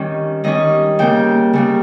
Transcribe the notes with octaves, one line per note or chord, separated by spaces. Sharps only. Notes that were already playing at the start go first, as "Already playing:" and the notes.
Already playing: D#3 G3 C#4
D#3 G3 C#4 D#5
C#3 G3 A#3 G5
C#3 G3 A#3